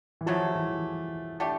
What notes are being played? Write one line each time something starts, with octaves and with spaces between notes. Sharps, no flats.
E3
C#3 F3 F#3 A3
E3
A3 D4 G4